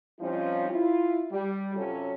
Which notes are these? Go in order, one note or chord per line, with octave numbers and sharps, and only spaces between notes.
F3 G3 C4 C#4 D#4 F4
E4 F4
G3
F#2 C3 F#3 C#4 F4 A4